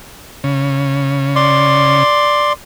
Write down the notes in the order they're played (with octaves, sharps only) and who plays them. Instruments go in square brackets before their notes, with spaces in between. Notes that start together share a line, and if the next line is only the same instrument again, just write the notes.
[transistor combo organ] C#3
[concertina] D5 C6